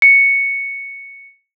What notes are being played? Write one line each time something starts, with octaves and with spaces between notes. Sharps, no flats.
C#7